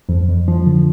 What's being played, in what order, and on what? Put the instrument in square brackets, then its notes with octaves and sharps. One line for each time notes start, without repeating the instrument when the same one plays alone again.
[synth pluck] F2
F2
F3
D3